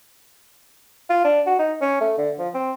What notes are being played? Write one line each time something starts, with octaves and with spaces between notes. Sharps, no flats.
F4
D4
F#4
D#4
C#4
A3
D3
F3
C4